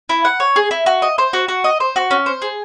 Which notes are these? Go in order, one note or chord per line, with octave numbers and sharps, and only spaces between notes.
E4
F#5
C#5
G#4
E4
F#4
D#5
C5
F#4
F#4
D#5
C5
F#4
C#4
C5
G#4